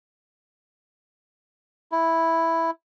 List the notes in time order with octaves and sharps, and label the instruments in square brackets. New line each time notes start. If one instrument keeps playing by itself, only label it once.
[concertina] E4